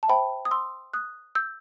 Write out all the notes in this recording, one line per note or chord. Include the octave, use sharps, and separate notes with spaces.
A5
C5 E5 G5 B5
D#6
C6 E6
D#6 F#6
E6 G6